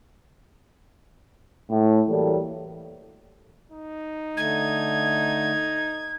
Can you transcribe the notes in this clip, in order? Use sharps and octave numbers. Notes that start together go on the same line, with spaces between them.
A2
E3 F#3 G3 A#3 A4
D#4
D3 A3 G#6